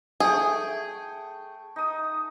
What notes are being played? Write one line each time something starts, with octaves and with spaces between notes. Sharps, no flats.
A3 G#4 G5 C#6
D#4 D#6